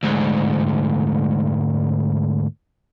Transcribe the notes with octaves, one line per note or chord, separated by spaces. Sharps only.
D2 G#2